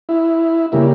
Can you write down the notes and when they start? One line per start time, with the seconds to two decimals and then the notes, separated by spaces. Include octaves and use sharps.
0.09 E4
0.72 C#3 G3 A#3 E4